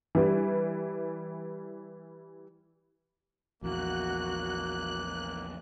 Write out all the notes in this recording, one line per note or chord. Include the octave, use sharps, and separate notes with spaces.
E3 G3
A#1 E2 A#3 F#4 F#6